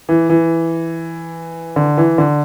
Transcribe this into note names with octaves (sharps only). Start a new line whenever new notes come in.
E3
E3
D3
E3
D3